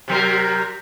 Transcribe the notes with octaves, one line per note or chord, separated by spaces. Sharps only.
C3 F#3 A#4